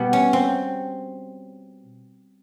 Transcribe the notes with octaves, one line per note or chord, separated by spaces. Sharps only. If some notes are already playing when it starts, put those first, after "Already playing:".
Already playing: B2 G3 B3
C#4
C4